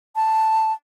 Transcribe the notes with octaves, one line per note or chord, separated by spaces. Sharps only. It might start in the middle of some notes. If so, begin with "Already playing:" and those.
A5